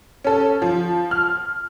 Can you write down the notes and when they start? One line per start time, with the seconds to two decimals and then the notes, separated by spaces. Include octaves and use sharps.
0.24 C#4 A4
0.62 F3
1.11 F6